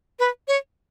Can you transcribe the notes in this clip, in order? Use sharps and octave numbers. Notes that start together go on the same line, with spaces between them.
B4
C#5